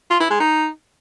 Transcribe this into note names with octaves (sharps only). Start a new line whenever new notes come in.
F4
E4
G#3
D#4